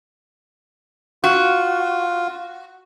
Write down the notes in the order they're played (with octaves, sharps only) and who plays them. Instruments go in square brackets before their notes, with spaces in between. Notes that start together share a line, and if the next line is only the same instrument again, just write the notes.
[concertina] F4 [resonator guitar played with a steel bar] F#4